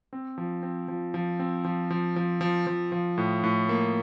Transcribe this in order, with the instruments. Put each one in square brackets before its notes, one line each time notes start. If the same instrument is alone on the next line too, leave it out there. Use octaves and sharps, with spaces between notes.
[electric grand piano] C4
F3
C4
F3
F3
C4
F3
F3
F3
F3
F3
F3
A2
A2
A#3